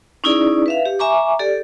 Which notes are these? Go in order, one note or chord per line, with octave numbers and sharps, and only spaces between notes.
C#4 D#4 E4 G#4 D5
B4 E5 F5
G4
E5 G#5 A#5 C#6 D6
G4 A4 D5